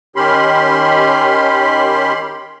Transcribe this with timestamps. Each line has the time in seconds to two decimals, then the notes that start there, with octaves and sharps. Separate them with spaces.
0.16 D#3 C#4 G4 B5 C6